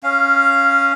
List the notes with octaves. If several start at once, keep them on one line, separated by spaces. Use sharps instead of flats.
C#4 F5